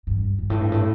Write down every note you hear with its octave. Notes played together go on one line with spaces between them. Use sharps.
G2
G2
A2
G2
A2